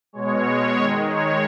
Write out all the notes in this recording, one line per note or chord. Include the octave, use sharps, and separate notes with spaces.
B2 G#3 C#5
D#3 G#3 C#5
C#5